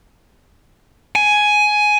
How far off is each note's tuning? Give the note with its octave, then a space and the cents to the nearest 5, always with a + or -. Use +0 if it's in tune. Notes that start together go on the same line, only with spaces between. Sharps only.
G#5 +10